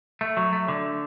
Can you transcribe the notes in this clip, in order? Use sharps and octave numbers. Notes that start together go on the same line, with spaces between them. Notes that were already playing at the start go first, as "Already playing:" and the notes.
A3
F#3
A3
D3